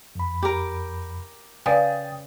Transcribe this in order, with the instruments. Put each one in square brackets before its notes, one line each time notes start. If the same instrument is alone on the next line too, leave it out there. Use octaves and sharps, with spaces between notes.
[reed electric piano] F2 B5
[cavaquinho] G4 A#4
[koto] C#3 [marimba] B4 D5 F5 [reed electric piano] G5 D#6 A6